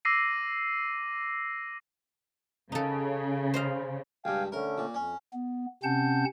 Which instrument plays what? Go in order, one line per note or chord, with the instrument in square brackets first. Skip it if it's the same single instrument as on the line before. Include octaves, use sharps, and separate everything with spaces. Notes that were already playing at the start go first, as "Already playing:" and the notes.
[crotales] D6 E6 A#6 C7 D#7
[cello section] C#3 [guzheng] D#4 A4
[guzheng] C5 D#5 F5
[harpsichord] C#2 G2 [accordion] F5 G5 G#5
[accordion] D3 A3 C#4 [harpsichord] A#4
[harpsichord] A#2
[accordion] F2 [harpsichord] C#4
[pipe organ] B3
C3 C4 C#4 F#5 A5 G6